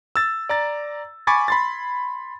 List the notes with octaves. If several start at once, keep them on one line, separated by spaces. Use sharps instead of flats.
E6 A6
D5 A#5 A6
G#5 B5 C#6 D6 G#6 A6
B5 C6 A6